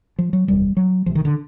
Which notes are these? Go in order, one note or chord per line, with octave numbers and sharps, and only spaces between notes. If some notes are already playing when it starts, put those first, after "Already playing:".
F3
F#3
F#1 E2 C3 G3
F#3
C#2 C3 F3
D#3
D3